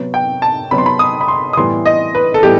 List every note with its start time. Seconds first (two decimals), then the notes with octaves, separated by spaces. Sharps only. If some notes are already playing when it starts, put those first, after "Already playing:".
Already playing: C3 F#3 B3
0.14 G5
0.42 A5
0.71 C3 F#3 B3 B5
0.78 C6
0.86 B5
0.99 D#6
1.21 B5
1.28 C6
1.53 D#6
1.57 A2 E3 G3 B3 C6
1.86 D#5
2.15 B4
2.34 A4
2.43 A2 E3 G3 B3 G4